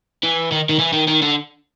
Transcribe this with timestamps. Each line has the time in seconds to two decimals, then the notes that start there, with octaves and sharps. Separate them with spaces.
0.23 E3
0.52 D#3
0.69 D#3
0.79 E3
0.93 D#3
1.08 D#3
1.22 D3